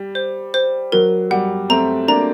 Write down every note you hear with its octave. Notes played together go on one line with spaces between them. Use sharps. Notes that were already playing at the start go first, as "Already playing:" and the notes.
Already playing: G3
C5
C5
F#3 A#4
G3 F#5
A3 C4 A#5
A#3 D4 A#5